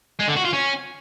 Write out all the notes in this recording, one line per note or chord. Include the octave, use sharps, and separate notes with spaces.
G#3
D3
F#4
F4
C#4